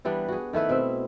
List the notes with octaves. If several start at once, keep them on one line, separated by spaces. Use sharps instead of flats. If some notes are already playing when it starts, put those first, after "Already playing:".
E3 G3 B3 D4
F#4 G#4
D#3 A3 E4 B4
B2 C4 E5